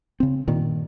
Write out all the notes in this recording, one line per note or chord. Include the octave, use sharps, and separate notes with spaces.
C#3 C4
G2 A#2 D#3